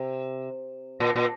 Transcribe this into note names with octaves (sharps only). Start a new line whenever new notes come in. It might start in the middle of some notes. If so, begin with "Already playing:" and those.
Already playing: C3
A#2
A#2